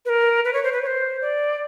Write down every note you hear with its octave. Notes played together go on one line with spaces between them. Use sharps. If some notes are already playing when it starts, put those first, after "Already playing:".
B4
A#4
B4
C#5
C5
B4
C#5
C5
D5